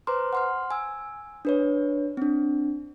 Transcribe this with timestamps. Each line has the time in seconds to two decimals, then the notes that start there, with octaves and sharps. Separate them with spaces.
0.07 B4 C5 A#5 C6 D6 F6
0.33 F#5 C6 F6
0.71 G#5 E6
1.45 D4 B4 C#5
2.17 C4 D4